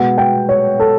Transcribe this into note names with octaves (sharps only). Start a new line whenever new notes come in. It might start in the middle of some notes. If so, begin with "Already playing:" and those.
Already playing: B2 G#3 B3 F#5
G5
C#5
A4